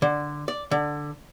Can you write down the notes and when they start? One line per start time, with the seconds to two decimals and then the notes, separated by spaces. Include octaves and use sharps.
0.02 D3
0.48 D5
0.71 D3